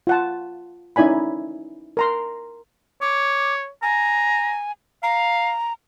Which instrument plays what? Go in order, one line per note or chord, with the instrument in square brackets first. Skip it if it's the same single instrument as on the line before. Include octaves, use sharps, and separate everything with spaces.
[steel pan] F4 F#5 A5
C#4 D#4 E4 D5 G#5 B5
A#4 A#5 C6
[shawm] C#5 [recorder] D6
[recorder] G#5 [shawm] A#5
[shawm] F5 [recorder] A#5